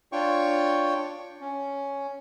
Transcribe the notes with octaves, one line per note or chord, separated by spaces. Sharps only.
D4 F4 C#5 G5 C#6
C#4